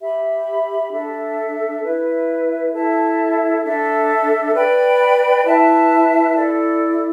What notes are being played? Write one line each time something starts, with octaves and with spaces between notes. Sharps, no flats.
G4 E5 B5
D4 A4 E5
E4 B4 E5
E4 A4 E5 A5
D4 A4 E5
B4 D5 G5 B5
E4 B4 E5 A5
E4 A4 D5